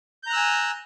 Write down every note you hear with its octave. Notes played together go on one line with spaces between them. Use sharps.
G#5 A#5 E6 F#6 G6